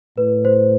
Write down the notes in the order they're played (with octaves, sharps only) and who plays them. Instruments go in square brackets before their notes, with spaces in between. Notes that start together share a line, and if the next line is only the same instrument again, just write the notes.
[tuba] A2 [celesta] B4
[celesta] C5